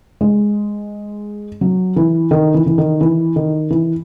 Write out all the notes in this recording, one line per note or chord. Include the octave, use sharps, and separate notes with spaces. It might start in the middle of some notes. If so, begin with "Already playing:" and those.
G#3
F#3
E3
D#3
E3
E3
D#3
E3
D#3
E3